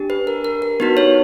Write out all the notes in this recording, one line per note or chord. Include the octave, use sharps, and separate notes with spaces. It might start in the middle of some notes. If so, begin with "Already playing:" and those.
Already playing: D4 G4
B4
A#4
A#4
A#4
B3 D#4 F#4 B4
B4 C#5